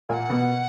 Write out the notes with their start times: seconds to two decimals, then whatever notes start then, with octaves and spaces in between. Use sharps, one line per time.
0.09 A#2 A#3 F#5 G#5
0.30 B2 B3